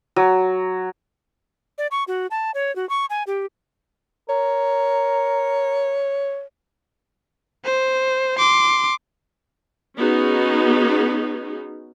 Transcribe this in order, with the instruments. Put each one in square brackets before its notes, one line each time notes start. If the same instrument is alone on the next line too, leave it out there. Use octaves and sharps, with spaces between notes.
[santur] F#3
[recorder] D5
C#6
F#4
A5
C#5
F#4
C#6
G#5
G4
[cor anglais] A#4 [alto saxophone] C#5
[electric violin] C5
C6 D6
[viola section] B3 C#4 D#4 F#4 G#4